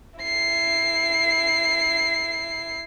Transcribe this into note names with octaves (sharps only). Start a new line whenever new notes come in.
E4 C7